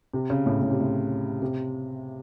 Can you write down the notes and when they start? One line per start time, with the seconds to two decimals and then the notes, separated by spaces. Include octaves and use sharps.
0.13 C3
0.30 C#3
0.46 A2
0.62 A2
0.71 C3
0.80 A2
1.42 C3